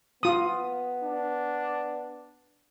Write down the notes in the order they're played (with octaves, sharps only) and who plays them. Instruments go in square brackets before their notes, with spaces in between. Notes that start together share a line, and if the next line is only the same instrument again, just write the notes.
[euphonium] B3 [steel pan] F4 D#6
[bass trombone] D4